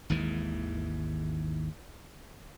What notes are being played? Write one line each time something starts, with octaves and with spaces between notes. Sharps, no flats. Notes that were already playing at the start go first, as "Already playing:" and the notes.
G#1 D#2 G#2 E3